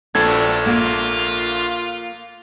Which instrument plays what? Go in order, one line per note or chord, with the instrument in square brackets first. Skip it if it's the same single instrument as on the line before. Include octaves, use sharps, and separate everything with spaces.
[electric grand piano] A#1 A4 G#6 [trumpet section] C4 D4 [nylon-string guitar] F4 F#4 B4
[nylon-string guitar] A#3 [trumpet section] F4